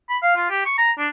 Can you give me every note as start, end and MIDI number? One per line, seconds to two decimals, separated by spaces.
0.09 0.17 83
0.22 0.35 77
0.36 0.48 65
0.50 0.61 67
0.66 0.74 85
0.78 0.91 82
0.98 1.08 62